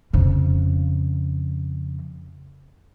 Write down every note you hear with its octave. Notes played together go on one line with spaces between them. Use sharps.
F2 C#3